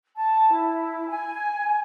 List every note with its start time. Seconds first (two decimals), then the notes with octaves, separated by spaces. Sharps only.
0.16 A5
0.51 E4
1.07 G#5